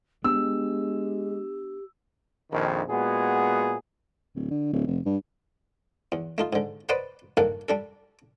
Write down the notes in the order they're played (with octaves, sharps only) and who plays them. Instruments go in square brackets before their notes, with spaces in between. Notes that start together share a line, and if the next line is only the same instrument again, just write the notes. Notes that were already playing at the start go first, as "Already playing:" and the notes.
[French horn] G#3 [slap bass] B3 D4 [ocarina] G4 [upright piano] E6
[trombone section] A#1 F2 D#3
A#2 G#3 B3 F#4 G#4
[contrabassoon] D1
D3
D1
F1
G2
[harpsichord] E2
A3 D#4 F4
G#2 D3
B4 C5 D5 D#5 F#5 A#5
G2 D#3 A#3 A4 A#4 F#5
G3 D4 A4